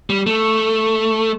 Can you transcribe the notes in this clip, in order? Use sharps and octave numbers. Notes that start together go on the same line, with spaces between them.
G3
A3